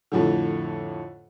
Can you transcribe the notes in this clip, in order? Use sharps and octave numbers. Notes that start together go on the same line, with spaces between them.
F2 A2 D3